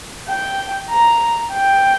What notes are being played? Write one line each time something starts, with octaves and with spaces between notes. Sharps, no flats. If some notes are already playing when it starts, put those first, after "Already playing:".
G5
A#5
G5